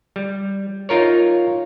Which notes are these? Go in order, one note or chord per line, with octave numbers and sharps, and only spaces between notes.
G3
D#4 F4 A#4 C#5